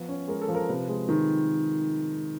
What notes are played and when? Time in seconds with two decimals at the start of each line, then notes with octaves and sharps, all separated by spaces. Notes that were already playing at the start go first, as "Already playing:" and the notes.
Already playing: F3 B3
0.09 C#4
0.28 G#3 A#4
0.42 A4
0.48 F3
0.55 A#4
0.69 C3 B4
0.89 G#3
1.09 D#3